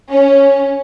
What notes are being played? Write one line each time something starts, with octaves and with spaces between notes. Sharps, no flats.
C#4